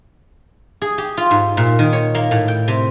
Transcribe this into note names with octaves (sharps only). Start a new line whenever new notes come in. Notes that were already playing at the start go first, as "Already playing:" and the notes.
G#4
G4
F4
G#2
A#2
D#3
C#5
A#3
A2
G5
C3